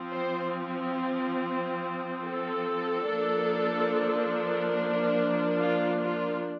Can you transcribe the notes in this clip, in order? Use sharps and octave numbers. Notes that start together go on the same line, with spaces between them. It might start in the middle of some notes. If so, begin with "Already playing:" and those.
Already playing: F3 C4
C5
A4
F3 A#3 D4
F4
F4